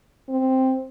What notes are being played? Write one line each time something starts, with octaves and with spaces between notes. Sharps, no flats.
C4